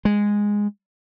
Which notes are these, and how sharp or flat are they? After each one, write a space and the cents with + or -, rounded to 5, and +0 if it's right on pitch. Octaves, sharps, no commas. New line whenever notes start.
G#3 -10